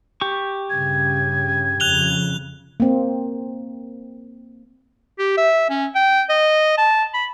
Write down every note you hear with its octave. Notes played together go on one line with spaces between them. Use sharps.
G4 C#6
G2 C#3 G#6
F2 C#3 F#6 F7 G7
A#3 C4
G4
E5
C#4
G5
D#5
A5
B5